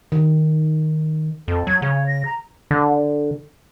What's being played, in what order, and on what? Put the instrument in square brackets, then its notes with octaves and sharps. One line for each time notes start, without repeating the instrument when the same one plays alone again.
[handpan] D#3
[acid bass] F2 [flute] A4
[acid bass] F#3 [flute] G#6
[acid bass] C#3 [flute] C#5
[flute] A#6
A#5
[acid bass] D3